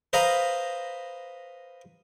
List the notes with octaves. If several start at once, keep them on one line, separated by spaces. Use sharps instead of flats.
B4 C5 D#5 F5 A#5 B5